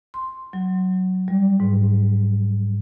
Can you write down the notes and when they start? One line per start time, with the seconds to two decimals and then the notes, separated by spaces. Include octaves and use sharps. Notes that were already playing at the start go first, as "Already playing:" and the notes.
0.14 C6
0.53 F#3
1.28 G3
1.60 G#2